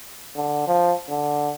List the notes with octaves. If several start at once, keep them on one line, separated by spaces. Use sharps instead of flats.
D3
F3
D3